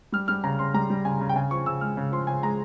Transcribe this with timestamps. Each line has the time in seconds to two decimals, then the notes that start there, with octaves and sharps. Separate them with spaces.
0.12 G3 F6
0.28 G3 F6
0.44 C#3 A#5
0.59 C#3 C6
0.74 G3 A#5
0.90 G3
1.05 C#3 G#5
1.21 C#3
1.29 G5
1.35 C#3 G#5
1.51 F3 C#6
1.66 C#3 E6
1.81 G#3 F6
1.97 C#3
2.12 F3 C6
2.27 C#3 G#5
2.43 G#3 A#5